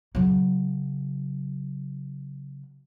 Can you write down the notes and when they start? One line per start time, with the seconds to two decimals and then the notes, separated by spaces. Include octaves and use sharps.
0.15 C#3 F#3